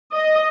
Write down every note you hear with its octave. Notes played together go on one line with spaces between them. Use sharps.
D#5